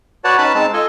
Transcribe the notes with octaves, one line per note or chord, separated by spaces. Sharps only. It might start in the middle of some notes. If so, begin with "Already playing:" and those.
F#4 B4 C#5 D5 F#5 A5
C#4 D#4 B4 A5 B5
G#3 C4 D#4 A5
F4 A4 D#5 G#5